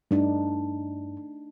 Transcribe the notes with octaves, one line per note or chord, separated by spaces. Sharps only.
G2 A3 D4 D#4